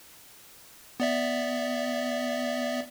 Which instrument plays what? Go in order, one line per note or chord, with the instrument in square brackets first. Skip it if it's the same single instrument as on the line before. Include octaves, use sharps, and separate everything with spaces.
[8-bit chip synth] B3 D5 E5